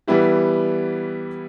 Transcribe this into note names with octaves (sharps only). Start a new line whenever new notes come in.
E3 G3 B3 E4 G4